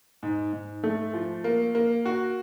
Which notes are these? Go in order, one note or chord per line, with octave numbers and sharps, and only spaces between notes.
G#2
G#2
A3
F3
A#3
A#3
F#4